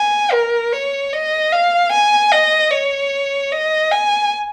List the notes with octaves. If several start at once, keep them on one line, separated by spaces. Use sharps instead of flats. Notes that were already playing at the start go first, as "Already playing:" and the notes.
Already playing: G#5
A#4
C#5
D#5
F5
G#5
D#5
C#5
D#5
G#5